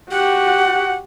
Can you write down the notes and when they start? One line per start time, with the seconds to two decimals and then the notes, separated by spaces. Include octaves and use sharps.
0.11 F#4 G4 F#5